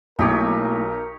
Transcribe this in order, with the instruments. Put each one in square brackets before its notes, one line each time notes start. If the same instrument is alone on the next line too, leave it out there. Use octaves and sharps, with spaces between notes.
[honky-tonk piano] B1 [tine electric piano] A3 A#3 E4 [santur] D#4 G4 C#5 [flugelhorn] A#4